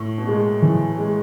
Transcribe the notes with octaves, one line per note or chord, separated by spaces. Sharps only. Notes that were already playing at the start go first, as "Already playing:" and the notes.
Already playing: A2
B2
A#2 G#3
E3
G#3